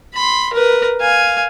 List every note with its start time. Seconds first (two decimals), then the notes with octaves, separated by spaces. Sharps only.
0.14 B5 C6
0.53 A#4 B4
1.01 F5 G#5